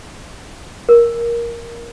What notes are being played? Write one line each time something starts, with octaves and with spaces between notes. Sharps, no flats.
A#4